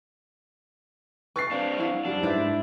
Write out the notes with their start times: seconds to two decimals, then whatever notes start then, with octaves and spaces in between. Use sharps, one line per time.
1.36 B4 E5 C#6 A6 C7
1.51 G3 C4 D4 G4 F5
1.78 E4 F5 F#5
2.05 F#2 G3 D4
2.23 G#2 E4 B4 C5 D5 E5